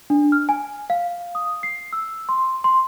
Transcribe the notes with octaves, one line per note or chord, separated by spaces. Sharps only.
D4
F6
G#5
F5
D#6
C7
E6
C6
C6